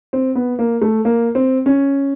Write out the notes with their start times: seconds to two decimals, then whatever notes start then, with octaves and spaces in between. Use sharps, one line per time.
0.13 C4
0.35 B3
0.59 A#3
0.82 A3
1.05 A#3
1.35 C4
1.66 C#4